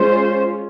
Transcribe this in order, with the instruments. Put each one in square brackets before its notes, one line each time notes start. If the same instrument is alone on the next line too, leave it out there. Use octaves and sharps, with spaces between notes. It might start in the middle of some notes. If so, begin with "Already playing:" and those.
Already playing: [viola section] G#3 C#4 F4 C5